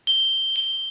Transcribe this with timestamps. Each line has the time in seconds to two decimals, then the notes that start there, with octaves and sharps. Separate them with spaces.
0.07 G7
0.56 G7